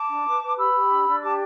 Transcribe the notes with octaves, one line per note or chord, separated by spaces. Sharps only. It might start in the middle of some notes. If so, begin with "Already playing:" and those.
Already playing: A5 D6
D4
B4
B4
G4 B5 E6
G4
D4
D4
G4 A5 D6